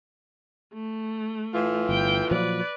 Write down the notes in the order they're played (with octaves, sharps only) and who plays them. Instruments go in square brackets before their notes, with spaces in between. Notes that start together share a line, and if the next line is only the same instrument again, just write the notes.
[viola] A3
[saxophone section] A2 E3 F4
[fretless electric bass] G1 [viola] G5
[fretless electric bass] A#2 F3 F#3 [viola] B4 D5